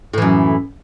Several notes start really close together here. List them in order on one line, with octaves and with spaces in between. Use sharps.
A2 E3 F#2